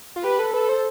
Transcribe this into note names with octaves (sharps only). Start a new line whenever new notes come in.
F4
G4 B4
A4
A4 B4
C5